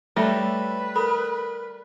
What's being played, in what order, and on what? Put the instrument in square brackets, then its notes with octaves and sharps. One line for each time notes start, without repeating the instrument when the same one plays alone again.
[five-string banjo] G3 A3 [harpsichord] A4 C#5 [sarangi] B4 [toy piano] E5
[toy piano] A4 B5 [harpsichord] A#4